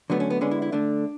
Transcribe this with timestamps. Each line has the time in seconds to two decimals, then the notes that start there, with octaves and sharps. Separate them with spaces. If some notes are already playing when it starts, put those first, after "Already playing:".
0.10 D3 F#3 A3 B3
0.20 C#4
0.30 B3
0.41 D3 G#3 B3 C#4
0.51 E4
0.62 E4
0.72 D3 A3 D4